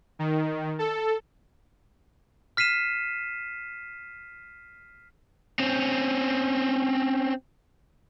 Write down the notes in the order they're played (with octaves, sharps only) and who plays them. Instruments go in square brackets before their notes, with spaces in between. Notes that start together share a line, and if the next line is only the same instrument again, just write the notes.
[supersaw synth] D#3
A4
[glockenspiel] F6 B6 C7 D#7 E7
[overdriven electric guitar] C4 C#4